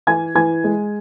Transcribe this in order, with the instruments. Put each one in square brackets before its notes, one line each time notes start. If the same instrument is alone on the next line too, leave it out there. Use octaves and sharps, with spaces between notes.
[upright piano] E3 G#5 G#6
E3 G#5 G#6
G#3